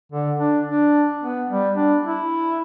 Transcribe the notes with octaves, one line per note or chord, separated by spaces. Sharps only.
D3
D4
D4
B3
G3
D4
E4